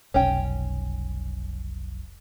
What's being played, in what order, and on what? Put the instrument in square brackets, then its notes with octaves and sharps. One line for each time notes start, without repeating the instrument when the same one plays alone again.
[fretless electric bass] F1 B1 [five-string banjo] C#4 G5